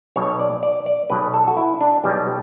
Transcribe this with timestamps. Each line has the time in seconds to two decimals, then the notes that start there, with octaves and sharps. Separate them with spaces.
0.16 B1 B2 C#5
0.40 D5
0.63 D5
0.86 D5
1.10 B1 B2 B4
1.34 A4
1.47 F#4
1.57 E4
1.81 D4
2.04 B1 B2 G3